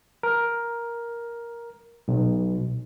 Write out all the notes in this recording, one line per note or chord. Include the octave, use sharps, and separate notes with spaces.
A#4
B1